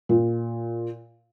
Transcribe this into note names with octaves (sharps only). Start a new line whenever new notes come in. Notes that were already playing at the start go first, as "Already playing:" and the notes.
A#2